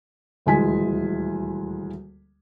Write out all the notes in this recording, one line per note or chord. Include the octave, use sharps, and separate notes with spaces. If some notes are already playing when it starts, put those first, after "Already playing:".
D#1 D2 E3 G#3 G#5 B6